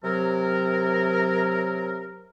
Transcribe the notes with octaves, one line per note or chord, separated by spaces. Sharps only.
C3 F#3 A#4